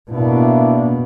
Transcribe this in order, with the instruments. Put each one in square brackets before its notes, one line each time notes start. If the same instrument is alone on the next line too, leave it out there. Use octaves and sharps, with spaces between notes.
[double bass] B2 [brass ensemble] A#3 D4 E4